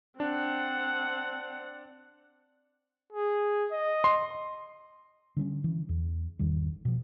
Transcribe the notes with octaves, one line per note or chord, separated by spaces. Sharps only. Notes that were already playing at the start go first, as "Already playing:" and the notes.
C4 D4 F#5
G#4
D#5
C6
D3 G3 C4 C#4
E3
E2
G#1 E2 D#3 G3
B2 F3